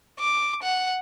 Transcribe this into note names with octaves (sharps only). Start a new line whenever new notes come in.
D6
F#5